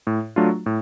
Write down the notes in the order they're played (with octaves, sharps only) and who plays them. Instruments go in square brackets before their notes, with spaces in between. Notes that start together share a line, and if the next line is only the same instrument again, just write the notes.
[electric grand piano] A2
F#3 A3 D4 F4
A2